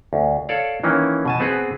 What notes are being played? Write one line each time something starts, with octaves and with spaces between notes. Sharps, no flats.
D2
A4 C#5 D5 F5
D#3 E3 A#3 C#4
B2 G#5 A5
B3 C4 F#4 G#4 B4